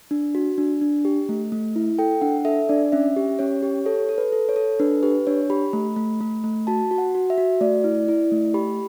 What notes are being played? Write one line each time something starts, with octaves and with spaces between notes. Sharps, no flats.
D4
F#4
D4
D4
G4
A3
A3
E4
A4 G5
D4 F#5
A4 E5
D4 D5
C#4 E5
G4
C#4 C#5
G4
A4 C#5
A4
B4
A4
C#5
A4
D4 B4
G4 B4
D4 C#5
G4 B5
A3
A3
A3
A3
F#4 A5
F#4
F#5
F#4
E5
F#4
A3 D5
E4
E4
A3
G4 B5